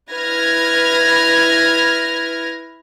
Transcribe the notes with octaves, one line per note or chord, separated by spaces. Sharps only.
E4 B4 F6 G#6 A#6